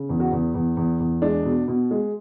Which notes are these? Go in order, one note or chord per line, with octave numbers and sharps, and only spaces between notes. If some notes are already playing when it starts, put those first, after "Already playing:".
Already playing: C#3
E2
F#4
E2
E2
E2
E2
G#3 D4
B2
B2
G#3